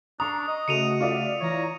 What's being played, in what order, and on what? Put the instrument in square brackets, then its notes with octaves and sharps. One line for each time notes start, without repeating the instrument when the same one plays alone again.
[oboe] D4 [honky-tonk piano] A#5 C#6 [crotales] D#6
[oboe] D#5
[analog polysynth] C#3 A3 F#4 [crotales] C#7 D#7 F7
[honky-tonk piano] F4 D5 E5
[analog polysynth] E3 A#5 [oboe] C#5